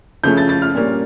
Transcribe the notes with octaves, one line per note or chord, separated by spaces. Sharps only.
C#3 F3 A3 C#4 G6
A6
A6
F6
A#2 G3 A#3 C#4